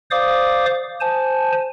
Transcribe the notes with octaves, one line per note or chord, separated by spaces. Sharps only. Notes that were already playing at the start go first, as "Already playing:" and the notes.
C5 D5 F5 D6 D#6
C5 G#5 A5